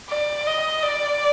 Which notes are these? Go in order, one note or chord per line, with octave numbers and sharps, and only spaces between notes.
D5
D#5
D5